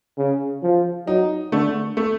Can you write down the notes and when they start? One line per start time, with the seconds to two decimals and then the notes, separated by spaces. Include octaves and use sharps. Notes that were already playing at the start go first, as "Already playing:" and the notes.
0.18 C#3
0.63 F3
1.07 F#3 D#4
1.52 D3 A3
1.97 A3